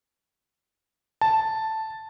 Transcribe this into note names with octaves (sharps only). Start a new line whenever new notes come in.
A5